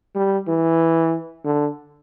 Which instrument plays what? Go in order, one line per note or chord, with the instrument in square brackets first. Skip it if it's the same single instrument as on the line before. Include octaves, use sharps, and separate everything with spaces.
[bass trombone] G3
E3
D3